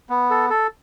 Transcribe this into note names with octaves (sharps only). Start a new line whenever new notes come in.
B3
A4
A4